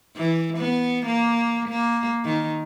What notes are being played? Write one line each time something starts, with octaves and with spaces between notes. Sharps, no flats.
E3
B3
A#3
A#3
D#3